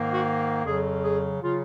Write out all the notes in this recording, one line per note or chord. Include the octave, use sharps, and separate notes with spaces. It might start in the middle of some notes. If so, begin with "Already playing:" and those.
Already playing: G#2 D#3 A#3
F#4
F2 C#3 F#3 G#4
G#4
C#3 F#3 F4